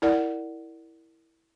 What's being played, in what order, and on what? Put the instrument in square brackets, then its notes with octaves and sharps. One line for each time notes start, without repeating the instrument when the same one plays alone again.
[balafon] E4 A#4 D5 F#5